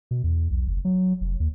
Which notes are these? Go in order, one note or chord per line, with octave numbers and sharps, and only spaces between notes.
B2
E2
B1
F#1
F#3
F1
D#2